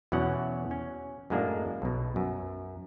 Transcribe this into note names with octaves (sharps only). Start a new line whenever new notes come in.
E2 B2 F#3 C#4 F#5
C#4
F#2 A2 G#3 A#3 D4
B1 B2
F#2